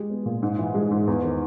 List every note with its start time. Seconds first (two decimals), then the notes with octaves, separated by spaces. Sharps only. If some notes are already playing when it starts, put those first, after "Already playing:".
Already playing: G#3 G4
0.10 B3
0.26 A#2
0.43 G#2
0.59 E3
0.75 G#3
0.91 G#2
1.07 E2
1.24 D#3